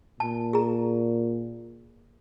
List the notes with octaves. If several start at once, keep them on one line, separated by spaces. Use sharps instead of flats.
A#2 A5
G#4 A#5